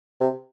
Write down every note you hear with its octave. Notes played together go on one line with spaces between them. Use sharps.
C3